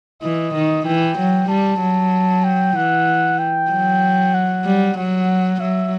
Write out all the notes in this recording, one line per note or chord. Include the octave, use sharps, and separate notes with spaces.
E3 D#5
D#3
E3 G5
F#3
G3 A5
F#3
G5
E3 F#5
G5
F#3
F#5
G3
F#3 F#5
F#3 E5